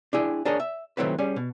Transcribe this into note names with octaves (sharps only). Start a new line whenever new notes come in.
D4 E4 G#4 G5
D4 G#4 A#4 C#5 D#5
E5
D#3 F#3 A3 C4 E4 B4
G3 C#4 G#4
B2